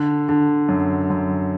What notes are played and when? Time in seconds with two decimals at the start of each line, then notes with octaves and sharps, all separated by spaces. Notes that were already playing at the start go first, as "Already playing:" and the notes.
Already playing: D3
0.29 D3
0.69 F#2
1.10 F#2